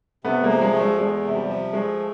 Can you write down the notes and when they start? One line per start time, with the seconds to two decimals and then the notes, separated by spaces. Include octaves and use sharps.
0.24 C3 A3 B3
0.43 G#3 A#3
0.49 F3
0.62 G#3
0.74 A3
0.80 G#3
0.98 E2 G#3
1.24 C3
1.36 G3
1.48 F3
1.73 G#3 A3